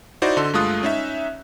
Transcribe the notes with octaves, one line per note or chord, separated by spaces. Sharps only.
D#4 E4 F#4 C5 D5
D3 A4 D#5 C6
G2 G#3 A3 F4 D#6 F#6
C#4 D#4 E5